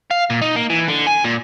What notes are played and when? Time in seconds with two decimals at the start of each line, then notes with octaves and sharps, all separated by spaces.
0.11 F5
0.30 A#2
0.42 D#4
0.56 A#3
0.70 E3
0.88 D3
1.07 G#5
1.25 A#2